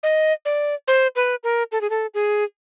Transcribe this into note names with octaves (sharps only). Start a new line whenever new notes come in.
D#5
D5
C5
B4
A#4
A4
G#4
A4
G#4